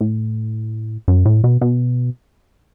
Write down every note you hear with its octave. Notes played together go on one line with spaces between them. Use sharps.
A2
F#2
A2
B2
B2